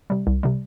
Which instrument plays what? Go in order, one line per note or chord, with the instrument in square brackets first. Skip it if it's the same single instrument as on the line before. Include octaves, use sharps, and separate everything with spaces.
[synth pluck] C3 G3
C2
C3 G3